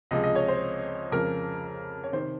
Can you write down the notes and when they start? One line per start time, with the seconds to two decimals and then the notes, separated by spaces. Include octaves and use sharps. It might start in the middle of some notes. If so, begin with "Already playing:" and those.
0.11 C#2 C3 F3 G#3 D#5
0.23 D#5
0.35 C#5
0.48 C5
1.12 F2 C#3 F3 G#3 A#4
2.03 C#5
2.13 C3 D#3 C5